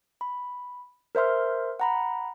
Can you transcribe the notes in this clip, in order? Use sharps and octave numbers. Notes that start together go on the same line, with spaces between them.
B5
A#4 C5 E5 C6 F6
F#5 A#5 B5